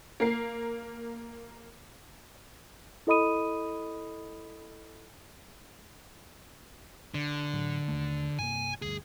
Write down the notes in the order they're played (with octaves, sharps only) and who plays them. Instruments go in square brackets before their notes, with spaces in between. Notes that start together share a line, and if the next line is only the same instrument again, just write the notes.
[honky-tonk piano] A#3 A#4 C7
[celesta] E4 A4 D#5 B5 D#6 D#7
[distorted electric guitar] D3
[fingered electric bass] A2 F#3
D#2 A3
[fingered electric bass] G2 C3 A#3 [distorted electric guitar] G#5
[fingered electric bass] D2 G2 [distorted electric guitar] G#4